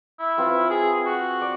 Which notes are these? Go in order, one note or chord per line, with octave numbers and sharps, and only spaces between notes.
E4
C4 F4 B4
G#4
F#4
D5